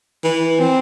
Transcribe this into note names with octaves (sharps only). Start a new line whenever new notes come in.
E3
C4